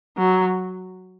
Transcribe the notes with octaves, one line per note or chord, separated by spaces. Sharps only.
F#3